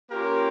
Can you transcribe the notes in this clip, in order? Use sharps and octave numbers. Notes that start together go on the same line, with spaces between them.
A#3 C#4 F4 G4 A#4